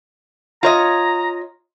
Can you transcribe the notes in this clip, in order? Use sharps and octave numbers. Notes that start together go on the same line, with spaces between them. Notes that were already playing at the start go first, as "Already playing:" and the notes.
F4 C#5 D#5 A#5